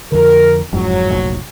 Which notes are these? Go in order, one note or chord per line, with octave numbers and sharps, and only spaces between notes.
F2 D3 A#4
F#1 F2 G#2 F#3
F1 A#1